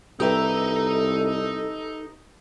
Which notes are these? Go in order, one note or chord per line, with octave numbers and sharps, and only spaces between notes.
C2 D#4 G4 A4 B4 E5 A#5